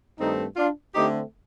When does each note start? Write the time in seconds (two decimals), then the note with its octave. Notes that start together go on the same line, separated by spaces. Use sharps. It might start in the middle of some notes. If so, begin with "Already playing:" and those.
0.18 G2 D#3 A3 C4 D#4
0.56 D4 F4
0.94 D3 A3 C4 D#4 G4